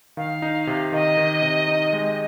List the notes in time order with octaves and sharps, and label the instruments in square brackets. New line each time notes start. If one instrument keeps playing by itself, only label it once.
[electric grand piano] D#3 [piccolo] F5
[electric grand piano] D#4
C3
[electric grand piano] D#3 [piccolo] D#5
[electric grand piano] D#3
C3
D#4
G#3